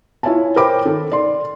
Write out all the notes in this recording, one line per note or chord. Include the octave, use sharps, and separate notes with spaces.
E4 F4 C#5 E5 G#5 A5
A#4 C5 C#5 G5 B5 D6
D#3 A4
D5 C6